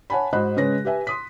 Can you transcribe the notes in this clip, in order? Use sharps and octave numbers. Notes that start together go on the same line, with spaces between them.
C#5 F#5 G#5 A5 B5
G#2 F#4 C5 D#5 B5 F#6
C#3 G#3 B4 C#5 A#6
G4 B4 E5 G#5
C6 D#6 B6